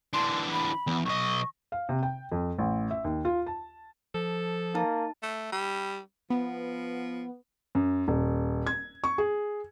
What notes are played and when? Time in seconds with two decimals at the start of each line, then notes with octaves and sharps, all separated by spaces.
0.14 E3 D4 C6
0.52 B5
0.87 E2
1.05 B1 D#5 C#6
1.72 F5
1.89 C3
2.03 G5
2.32 F2
2.58 A1
2.91 E5
3.04 D#2
3.25 F4
3.47 A5
4.15 F3 A4
4.75 A#3 D#4 A5
5.23 A3
5.52 G3
6.30 F3 B3
7.75 F#2
8.08 D#1
8.67 G#6
9.04 C#6
9.18 G#4